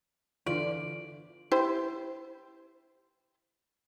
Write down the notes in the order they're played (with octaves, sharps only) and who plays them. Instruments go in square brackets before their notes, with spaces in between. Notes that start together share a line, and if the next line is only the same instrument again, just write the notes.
[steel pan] D3 E3 F4 [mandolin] D5
[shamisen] E4 G4 C5